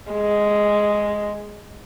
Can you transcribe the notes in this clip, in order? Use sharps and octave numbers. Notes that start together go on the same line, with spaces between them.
G#3